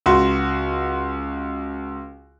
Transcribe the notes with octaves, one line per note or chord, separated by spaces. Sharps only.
C#2 F#4 C6